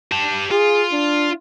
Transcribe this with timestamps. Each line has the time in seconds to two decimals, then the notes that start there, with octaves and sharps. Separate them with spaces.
0.12 G4 A5
0.51 F4 G#4
0.92 D4